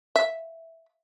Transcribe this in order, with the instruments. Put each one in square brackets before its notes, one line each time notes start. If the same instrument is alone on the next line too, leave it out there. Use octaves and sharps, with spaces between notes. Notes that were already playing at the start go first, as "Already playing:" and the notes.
[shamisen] E5